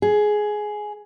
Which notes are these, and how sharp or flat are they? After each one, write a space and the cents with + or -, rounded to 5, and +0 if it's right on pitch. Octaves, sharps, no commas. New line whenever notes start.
G#4 +10